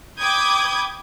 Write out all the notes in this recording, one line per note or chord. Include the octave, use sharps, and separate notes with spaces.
G5 B5 D6 D#6 G6 G#6